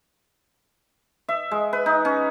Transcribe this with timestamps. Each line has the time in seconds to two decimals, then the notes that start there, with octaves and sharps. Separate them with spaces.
1.29 E5
1.51 G#3
1.73 B4
1.86 D#4
2.05 C#4